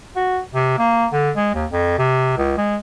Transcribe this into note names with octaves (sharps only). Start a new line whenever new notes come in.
F#4
C3
A#3
D3
G#3
D#2
F2
C3
C#2
G#3